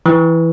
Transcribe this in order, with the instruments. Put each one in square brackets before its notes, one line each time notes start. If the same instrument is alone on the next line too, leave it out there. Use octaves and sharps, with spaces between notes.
[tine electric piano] E3